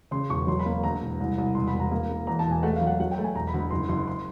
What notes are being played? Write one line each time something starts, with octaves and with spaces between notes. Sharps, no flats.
C#3 C6
E1 C#6
F#3 C6
B5
A#3
D2 A#5
E1
C2
C2
E1 C6
B5
E1
A#5
A#3
A#3
E2 A#5
A5
E1
G#5
A3 F#5
F5
F#3
F#5
F#3 F#5
G5
A3
G#5
E1 A#5
B5
D2
B5
F#1 C6
F#1 C6
C6